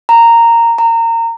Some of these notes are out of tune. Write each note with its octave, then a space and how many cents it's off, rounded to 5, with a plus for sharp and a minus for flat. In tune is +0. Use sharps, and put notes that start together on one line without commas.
A#5 -10
A#5 -25